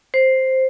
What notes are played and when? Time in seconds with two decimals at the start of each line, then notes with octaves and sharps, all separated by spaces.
0.14 C5